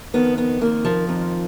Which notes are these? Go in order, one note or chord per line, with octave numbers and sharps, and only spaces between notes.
F2 D#3 B3
B3
F2 D#3 A#3
F3
F2 D#3